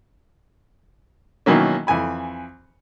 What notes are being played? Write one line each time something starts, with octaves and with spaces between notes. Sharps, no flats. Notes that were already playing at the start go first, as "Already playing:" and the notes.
B2 D#3 E3 F#3 A#3 C#4
F2 E3 G#5 B5